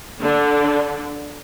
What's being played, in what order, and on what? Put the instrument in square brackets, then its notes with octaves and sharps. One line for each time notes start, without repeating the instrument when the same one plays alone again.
[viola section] D3 D4